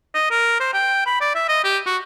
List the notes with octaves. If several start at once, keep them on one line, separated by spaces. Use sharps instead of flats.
D#5
A#4
C5
G5
B5
D5
E5
D#5
G4
F#4